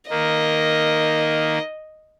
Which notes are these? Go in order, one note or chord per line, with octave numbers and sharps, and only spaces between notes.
D#3 A#3 D#5